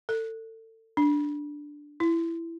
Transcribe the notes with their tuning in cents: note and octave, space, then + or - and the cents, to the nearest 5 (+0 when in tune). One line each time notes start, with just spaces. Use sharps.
A4 +30
D4 +0
E4 +15